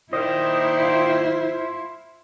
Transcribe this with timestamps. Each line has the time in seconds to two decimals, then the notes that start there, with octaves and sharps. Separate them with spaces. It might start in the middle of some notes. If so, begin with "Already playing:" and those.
0.13 A#2 D#3 E4 C5 D#5
0.82 F4